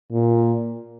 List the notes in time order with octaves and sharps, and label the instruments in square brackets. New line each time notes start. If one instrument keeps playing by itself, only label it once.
[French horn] A#2